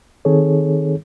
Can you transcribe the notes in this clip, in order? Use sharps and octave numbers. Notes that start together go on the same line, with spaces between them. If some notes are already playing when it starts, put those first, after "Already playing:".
D#3 C4 D#4 G#4 A4 C#5